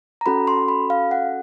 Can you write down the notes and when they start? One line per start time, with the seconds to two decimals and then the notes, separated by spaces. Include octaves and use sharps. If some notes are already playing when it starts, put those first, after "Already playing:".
0.21 A#5
0.26 C#4 F#4 A4 B5
0.47 C6
0.68 B5
0.90 F5
1.11 F#5